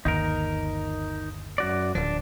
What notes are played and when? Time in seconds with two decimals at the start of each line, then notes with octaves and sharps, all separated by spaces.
0.05 G1 D#2 D#4 A#4
1.58 F#2 F#4 D5
1.95 D1 F3 D4